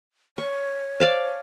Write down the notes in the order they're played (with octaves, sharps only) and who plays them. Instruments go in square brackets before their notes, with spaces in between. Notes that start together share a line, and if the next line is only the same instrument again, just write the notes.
[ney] C#5 [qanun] C#6
[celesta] C5 [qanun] D5 F5 A5